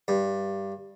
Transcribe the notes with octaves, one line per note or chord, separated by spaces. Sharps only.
G2